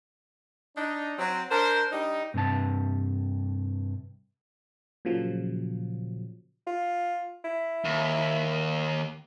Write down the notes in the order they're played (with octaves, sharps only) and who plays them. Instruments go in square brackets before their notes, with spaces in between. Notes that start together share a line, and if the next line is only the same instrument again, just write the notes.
[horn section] D4 D#4
F#3 C4
D4 A#4 C5
G3 D4 D#4
[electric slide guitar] G2 C3 A5
[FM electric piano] A#2 C#3 F3 F#3
[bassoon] F4
E4
[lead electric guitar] D#2